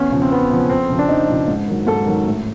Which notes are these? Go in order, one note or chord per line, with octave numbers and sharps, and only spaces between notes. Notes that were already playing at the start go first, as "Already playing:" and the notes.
Already playing: E2 C#4
C#3 F3
C4
E2 B3
C#3 F3
F2 C4
C#3 F3
D4
F2 D#4
C#3 F3
G#2
D#3 F#3
G#2 A4
D#3 F#3
A2